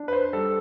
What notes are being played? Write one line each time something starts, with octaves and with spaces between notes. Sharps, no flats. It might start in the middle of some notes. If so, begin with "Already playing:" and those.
Already playing: D4
B4
C5
G3 A4